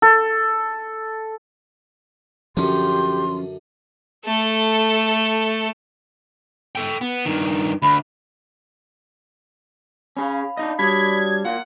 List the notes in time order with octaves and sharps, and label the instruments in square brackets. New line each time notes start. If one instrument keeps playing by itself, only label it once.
[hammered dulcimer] A4
[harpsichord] F#2 D3 [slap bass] F3 C#4 [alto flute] G4 [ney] C6
[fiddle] A3 A4
[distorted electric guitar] A4 G5
B3
G2 D#3
[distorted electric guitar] D2 [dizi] B5
[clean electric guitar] C#4 G#4 [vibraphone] F5 B5
[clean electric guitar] D4 D#4 D#5
[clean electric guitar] G3 D4 [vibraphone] F#4 C#5 D#6 [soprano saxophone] B5 [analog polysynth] G#6
[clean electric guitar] A#3 F4 [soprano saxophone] F#5